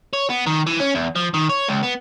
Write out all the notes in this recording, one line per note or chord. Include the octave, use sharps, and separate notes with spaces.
C#5
B3
D#3
E3
C#4
E2
F3
D#3
C#5
C#2
B3